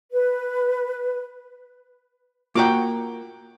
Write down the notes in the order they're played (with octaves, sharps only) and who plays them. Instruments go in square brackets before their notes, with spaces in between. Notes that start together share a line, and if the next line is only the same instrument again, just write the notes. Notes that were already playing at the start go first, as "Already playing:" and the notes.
[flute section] B4
[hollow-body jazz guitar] A#3 F#4 F#5 [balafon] F4 A#5 [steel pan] G5 D6